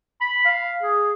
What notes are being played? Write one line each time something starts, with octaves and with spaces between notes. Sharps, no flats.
B5
F5
G#4